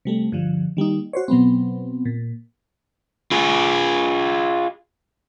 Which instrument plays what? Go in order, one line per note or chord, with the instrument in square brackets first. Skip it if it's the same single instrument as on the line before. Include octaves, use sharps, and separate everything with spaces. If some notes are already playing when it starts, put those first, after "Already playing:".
[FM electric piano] C3 G3 A3
G2 D3 F3
D#3 G3 A#3 D#4
F#4 C5 C#5
B2 F#3 B3 C4
A#2
[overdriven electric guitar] F4 G#4